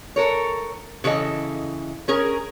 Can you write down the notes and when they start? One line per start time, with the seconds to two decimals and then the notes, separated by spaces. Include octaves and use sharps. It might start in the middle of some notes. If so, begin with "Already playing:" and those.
0.16 A4 A#4 C#5
1.04 C#3 E3 A4 D#5
2.08 C#4 G#4 A#4